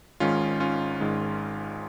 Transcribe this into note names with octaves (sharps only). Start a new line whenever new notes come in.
G#1 G#2 D#3 G#3 C#4 F4
C#4 F4
G#1 G#2 D#3 G#3